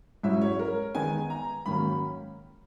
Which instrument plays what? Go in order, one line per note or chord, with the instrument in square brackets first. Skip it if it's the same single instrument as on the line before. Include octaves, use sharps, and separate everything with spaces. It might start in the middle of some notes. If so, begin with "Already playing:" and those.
[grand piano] G#2 F#3 C#4 E4 [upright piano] E5
[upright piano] C#5
A#4
[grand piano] D#3 G#3 B3 D#4 [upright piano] G#5
[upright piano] A#5
[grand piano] G#2 D#3 F#3 A#3 C#4 [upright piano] B5